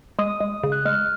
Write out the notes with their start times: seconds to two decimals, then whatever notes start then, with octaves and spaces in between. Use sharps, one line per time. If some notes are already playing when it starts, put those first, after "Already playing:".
0.19 G#3 D#6
0.40 G#3
0.64 C#3
0.72 F#6
0.85 G#3 F6